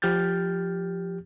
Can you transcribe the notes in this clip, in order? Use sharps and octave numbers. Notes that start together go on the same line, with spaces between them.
F3 G4 F6 G6 A6